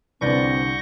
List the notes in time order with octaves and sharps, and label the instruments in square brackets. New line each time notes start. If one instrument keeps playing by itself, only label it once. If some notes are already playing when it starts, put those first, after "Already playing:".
[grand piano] C2 D3 [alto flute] C4 [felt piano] B4 D5 [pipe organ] C#6 G6 A#6